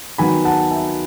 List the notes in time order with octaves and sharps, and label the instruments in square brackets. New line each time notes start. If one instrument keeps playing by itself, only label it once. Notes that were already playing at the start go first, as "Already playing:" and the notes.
[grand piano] D#3 F#3 B3 G#5 B5
F#5 A5
E5 G#5